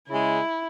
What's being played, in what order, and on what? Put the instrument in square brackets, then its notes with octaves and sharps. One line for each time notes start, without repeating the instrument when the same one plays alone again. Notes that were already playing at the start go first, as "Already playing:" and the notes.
[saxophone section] C#3 G#3 [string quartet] E4